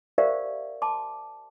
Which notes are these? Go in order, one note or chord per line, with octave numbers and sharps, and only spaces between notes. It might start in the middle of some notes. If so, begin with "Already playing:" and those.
G4 A#4 C5 D5 E5 F5
A5 C6 D6